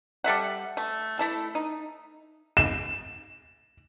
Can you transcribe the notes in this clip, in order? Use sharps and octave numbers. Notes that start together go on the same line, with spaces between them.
G3 A4 E5 F#5
A3
A3 E4 A4
D#4
E7